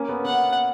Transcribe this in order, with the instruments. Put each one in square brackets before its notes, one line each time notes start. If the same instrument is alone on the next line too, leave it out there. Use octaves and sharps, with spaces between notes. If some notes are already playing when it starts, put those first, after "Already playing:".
Already playing: [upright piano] A#3 C#4
B3
[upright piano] B3 [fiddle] F#5